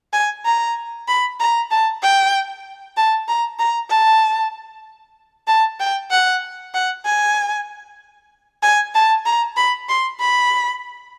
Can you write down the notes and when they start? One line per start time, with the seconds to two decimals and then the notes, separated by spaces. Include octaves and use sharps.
0.13 G#5
0.45 A#5
1.08 B5
1.39 A#5
1.71 A5
2.02 G5
2.97 A5
3.28 A#5
3.59 A#5
3.90 A5
5.48 A5
5.80 G5
6.10 F#5
6.74 F#5
7.05 G#5
8.63 G#5
8.94 A5
9.25 A#5
9.57 B5
9.89 C6
10.20 B5